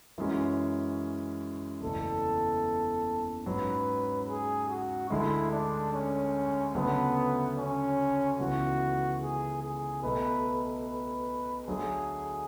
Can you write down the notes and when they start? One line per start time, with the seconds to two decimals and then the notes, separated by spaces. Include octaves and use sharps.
0.18 F#2 E3 G#3 C#4 F#4
1.81 F#1 E2 B2 A3 E4 A4
3.46 G#2 F#3 C#4 B4
4.28 G#4
4.69 F#4
5.10 D2 D3 G#3 E4
5.52 D4
5.93 C#4
6.74 D2 C#3 F#3 A3 B3 D4
7.57 C#4
8.39 C#2 C#3 E3 B3 F#4
9.21 G#4
9.62 G#4
10.02 B1 B2 A3 B4
10.85 B4
11.67 D2 D3 F#3 G#4